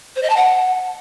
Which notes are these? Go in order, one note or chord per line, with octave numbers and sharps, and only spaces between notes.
C5
D#5
A5
F#5